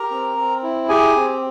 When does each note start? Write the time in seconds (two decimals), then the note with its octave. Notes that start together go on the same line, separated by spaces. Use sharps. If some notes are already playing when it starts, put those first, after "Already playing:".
Already playing: G4 A#4 A#5
0.11 C4
0.37 C4
0.63 E4
0.89 G4 G#4 G#5
1.16 C4